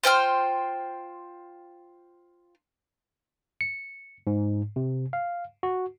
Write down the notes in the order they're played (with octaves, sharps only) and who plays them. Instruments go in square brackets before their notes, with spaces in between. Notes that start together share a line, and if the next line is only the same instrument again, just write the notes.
[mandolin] F4 C5 G5 F6
[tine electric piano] C#7
G#2
C3
F5
F#4